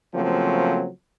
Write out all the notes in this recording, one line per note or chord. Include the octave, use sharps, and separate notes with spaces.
C#3 F3 F#3 A3 A#3 C4